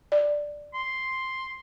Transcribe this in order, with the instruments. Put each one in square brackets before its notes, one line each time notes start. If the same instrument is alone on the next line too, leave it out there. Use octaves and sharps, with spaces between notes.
[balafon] D5
[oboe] C6